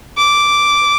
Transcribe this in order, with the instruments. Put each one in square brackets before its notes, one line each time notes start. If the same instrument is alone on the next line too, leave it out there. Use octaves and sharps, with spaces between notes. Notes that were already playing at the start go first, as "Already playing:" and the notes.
[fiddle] D6